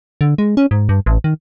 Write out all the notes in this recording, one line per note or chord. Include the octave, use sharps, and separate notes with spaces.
D3
G#3
C#4
G#2
G2
A1
D#3